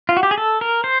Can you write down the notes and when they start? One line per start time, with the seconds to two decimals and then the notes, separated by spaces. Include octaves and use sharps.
0.09 F4
0.17 F#4
0.23 G4
0.31 G#4
0.38 A4
0.61 A#4
0.84 C5